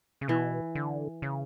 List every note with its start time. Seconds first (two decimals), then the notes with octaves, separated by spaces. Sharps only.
0.21 C#3
0.28 B2 E3
0.75 D3
1.22 C#3